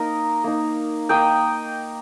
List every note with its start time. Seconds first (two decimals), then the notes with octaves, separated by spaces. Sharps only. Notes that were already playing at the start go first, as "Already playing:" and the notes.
Already playing: A#3 D#4 A#4 D#5
0.44 A#3 D#4
1.09 A#3 D#4 D#5 G5